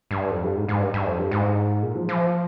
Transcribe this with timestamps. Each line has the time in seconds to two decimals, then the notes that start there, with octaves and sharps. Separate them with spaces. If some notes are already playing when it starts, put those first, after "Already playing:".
0.11 G2
0.31 F2
0.43 G2
0.56 G#2
0.68 G#2
0.81 G2
0.94 G2
1.06 F2
1.19 G2
1.31 G#2
1.83 A#2
1.96 F3
2.09 F3